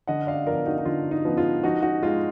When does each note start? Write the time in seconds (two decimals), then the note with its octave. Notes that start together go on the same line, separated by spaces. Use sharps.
0.07 D3 D#5 F#5
0.27 D5 F5
0.47 F3 B3 A#4 D5
0.66 D#4 F#4
0.78 D#4
0.85 D3 F4
1.11 D#4
1.25 F3 B3
1.37 F4
1.63 F3 D#4 F#4
1.82 D#4 F#4
2.03 G#3 D#4 F4